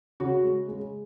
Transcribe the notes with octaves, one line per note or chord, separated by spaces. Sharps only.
C#3 F#4
G#3
G#3